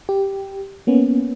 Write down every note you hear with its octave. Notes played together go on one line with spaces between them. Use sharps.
G4
A#3 B3 C#4